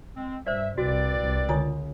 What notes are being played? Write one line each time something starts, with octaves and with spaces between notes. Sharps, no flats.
G#3 C4
G2 C5 D5 E5
C2 C4 F#4 B4 D5
C2
C#2 D3 F4 C#5 G#5 A#5 D#6